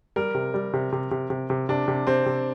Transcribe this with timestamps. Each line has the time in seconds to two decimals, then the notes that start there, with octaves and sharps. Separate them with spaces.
0.16 G3 A#4
0.35 C3
0.54 G3
0.73 C3
0.92 C3
1.11 C3
1.30 C3
1.50 C3
1.69 C3 D4
1.88 C3
2.07 C3 C4
2.26 C3